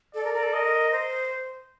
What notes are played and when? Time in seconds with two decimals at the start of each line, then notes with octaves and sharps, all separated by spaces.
0.15 A4 D5
0.24 A#4
0.34 A#4
0.43 A4
0.53 A#4 D#5
0.91 C5